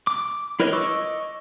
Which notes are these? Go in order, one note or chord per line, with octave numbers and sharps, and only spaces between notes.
D6
E4 A#4 B4 C#5 D#5
D#5 C#6 D6 E6